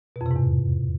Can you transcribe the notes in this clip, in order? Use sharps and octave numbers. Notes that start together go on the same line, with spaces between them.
B2
F2
C3
G#2
E2